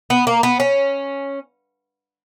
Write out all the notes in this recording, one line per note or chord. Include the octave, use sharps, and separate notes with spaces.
B3
A#3
B3
C#4